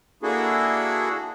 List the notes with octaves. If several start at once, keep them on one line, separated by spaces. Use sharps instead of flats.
A#3 D4 E4 F#4 G#4 A4